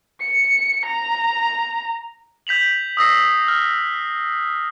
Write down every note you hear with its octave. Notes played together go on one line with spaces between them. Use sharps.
C#7
A#5
G6 B6 F7 F#7
D#6 E6 A#6 C7
F6